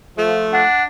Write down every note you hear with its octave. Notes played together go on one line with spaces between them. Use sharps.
F3 A3
D4 F#5